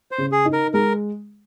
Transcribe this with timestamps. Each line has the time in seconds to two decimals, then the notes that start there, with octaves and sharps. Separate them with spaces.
0.11 C5
0.18 C#3
0.32 G#4
0.45 D#4
0.53 A#4
0.74 G#3 A#4